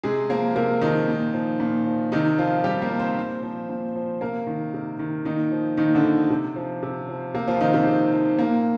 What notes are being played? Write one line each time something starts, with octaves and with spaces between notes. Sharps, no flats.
C3 G#3 G#4
F3 A#3 A#4
C3 A#3 A#4
D#3 F3 D#4
A#2
F3
A#2
F3
C3 D#3 D#4
F3 F4
C3 G3 G4
A#3 A#4
F3
C4 C5
A#2
F3
A#2
F3
C3 A#3 A#4
D#3
C3
D#3
A#2 D#3 D#4
F3
A#2 D#3 D#4
D3 D4
F3
C3
F3
C3
F3
C3 A#3
F3 F4
D#3 F3 D#4
C3 C4
C3
F3
A#2 A#3